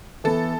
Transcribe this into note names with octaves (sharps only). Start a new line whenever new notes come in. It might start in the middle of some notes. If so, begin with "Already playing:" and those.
E3 B3 E4 A4